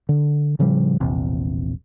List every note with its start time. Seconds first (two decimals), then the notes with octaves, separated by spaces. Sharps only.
0.09 D3
0.59 A2 C#3 F3 G3
1.00 E1 A#1 E2 C3